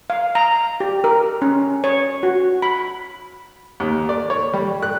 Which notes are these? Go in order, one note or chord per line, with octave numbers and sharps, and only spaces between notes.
F5
A#5
G4
A#4
C#4
C#5
F#4
B5
D#2
D5
C#5
G3
F#6